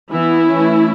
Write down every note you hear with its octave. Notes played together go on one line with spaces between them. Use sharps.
E3 B3 E4
E3 A3 C#4